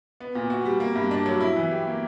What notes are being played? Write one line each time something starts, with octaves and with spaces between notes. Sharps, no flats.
B3
A#2
F#4
G3
A#3
G2
D4
F#3
E4
E3
G4
A#3